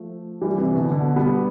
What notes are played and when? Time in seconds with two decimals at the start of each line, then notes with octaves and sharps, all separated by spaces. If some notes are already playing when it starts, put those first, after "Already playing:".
Already playing: F3 A3
0.42 E3 G3
0.58 C3 E3
0.75 B2 D3
0.92 B2 D3
1.16 G3 B3